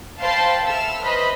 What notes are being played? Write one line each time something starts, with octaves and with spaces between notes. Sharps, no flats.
C5 F5 G5 A5 B5 C6
A4 E5 E6 F6
B4 C5 D#5 B5